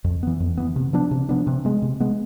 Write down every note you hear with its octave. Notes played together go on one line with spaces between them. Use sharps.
F2
E3 B3
F2
E3 B3
C3
F3 B3 D4
C3
F3 B3 D4
C3
G#3 B3
C3
G#3 B3